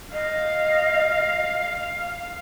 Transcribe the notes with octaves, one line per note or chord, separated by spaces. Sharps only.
D#5 F5